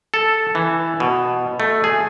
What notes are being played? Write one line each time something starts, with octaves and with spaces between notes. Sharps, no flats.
A4
E3
B2
A3
G#4